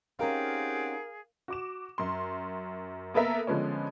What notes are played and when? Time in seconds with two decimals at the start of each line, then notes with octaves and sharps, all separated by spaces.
0.19 C4 C#4 D#4 G4 G#4 A#4 F5 F#5
1.48 F#4 D6 E7
1.98 F#2 C6
3.14 A#3 B3 A4 A#4 E5
3.47 D3 F3 G#3 B3 C#4